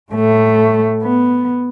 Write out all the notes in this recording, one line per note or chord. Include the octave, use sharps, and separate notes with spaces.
A2 A3
B3